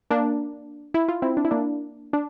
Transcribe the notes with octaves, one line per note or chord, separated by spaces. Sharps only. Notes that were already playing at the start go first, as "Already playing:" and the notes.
A#3 D4
E4
F4
C4 E4
D4
E4
A#3 D4
D4